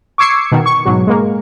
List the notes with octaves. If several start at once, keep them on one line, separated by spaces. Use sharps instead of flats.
C#6 D6 E6 G#6 C7 C#7
B2 D#3
C#6
G#2 B2 F#3
G#3 A#3